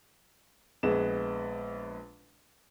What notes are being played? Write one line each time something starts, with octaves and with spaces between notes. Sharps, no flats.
A#1 G#3 B3 E7